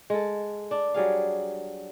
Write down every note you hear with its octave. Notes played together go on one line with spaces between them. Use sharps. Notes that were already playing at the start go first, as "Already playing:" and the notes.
G#3 A4
D4
F#3 G3 G#4 F5